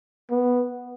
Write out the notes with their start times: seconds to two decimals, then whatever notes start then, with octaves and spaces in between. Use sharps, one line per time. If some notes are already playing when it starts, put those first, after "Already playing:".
0.30 B3